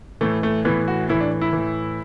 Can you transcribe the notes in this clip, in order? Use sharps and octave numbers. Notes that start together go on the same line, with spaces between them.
A2 E3 A3
A3
A2 E3 B3
F#4
A2 E3 E4
D4
E4
A2 E3